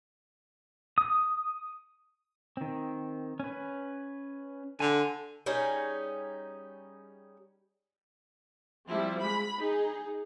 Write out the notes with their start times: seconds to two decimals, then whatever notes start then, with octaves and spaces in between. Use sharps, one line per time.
0.98 D#6
2.57 D#3 C4
3.40 C#4 B4
4.80 D3 G#5 C6
5.46 G3 C#4 D#4 G#4
8.90 F3 G3 C4 E4
9.21 G#3 B5
9.57 D#4 G#4